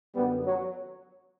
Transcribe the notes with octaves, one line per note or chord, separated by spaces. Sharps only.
F#2 D3 G3 B3
F#3